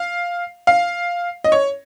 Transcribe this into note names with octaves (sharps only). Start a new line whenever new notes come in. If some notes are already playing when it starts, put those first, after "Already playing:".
Already playing: F5
F5
D#5
C#5